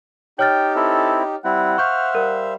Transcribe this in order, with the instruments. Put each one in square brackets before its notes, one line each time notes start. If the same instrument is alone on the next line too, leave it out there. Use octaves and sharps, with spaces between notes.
[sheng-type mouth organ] D#4 G4 [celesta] C#5 F6 A6 [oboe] G5
[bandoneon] C4 E4 [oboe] A4
[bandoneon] G3 C4 E4 [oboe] F#5
[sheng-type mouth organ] C5 E5 F5 [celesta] C#6 G6 [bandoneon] F6
[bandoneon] G3 [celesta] A#4